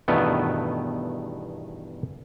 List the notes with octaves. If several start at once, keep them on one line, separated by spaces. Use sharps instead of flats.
E2 G2 B2 D#3 A3 B3